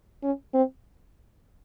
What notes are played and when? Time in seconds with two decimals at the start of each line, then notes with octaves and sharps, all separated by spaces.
0.23 C#4
0.54 C4